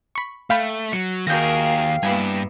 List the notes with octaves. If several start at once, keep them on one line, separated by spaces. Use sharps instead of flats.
B5 C#6
A3 F5 G5 B5
F#3 C#7
D#2 F#4 G#4 A#4 F5 G5 G6 A#6
G2 A#3 B3 E4 G#5